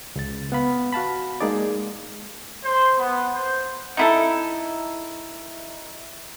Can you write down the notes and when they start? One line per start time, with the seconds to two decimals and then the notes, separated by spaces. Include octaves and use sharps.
0.16 C#2 A6
0.52 B3 F5 B5
0.92 F#4 F5 A5 B5
1.41 G#3 A#3 D#4 G#4 D5
2.63 C5
2.97 B3
3.34 C5
3.97 D#4 E4 A4